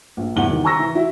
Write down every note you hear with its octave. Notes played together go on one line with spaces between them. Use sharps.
A#1
E2 E3 G3 F#5 G7
D#3
G#5 A#5 C#6 E6 A#6
E3
E4 F#4